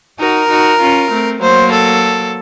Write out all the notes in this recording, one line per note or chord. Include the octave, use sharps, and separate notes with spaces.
D#4 F#4 A#4
D#4 F#4
C#4 F4
A3 C4
F#3 A#3 C5
A4